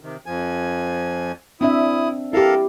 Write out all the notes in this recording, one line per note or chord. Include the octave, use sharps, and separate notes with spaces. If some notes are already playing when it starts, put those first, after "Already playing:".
C3 D#3
F2 F3 G#5
C4 D4 E4 E5 D#6
E4 G4 A4 A#4 F5